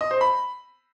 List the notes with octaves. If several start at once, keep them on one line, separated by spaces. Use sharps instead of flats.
D#5
C5
B5